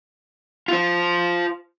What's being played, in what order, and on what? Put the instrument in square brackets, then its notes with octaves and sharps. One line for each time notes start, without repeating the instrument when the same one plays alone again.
[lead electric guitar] F4 C5